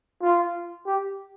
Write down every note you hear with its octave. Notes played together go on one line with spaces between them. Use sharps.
F4
G4